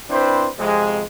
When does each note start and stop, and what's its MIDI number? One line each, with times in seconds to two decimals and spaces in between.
0.10 0.48 60
0.10 0.48 62
0.10 0.48 64
0.10 0.48 71
0.10 0.48 72
0.58 1.02 41
0.58 1.02 48
0.58 1.02 56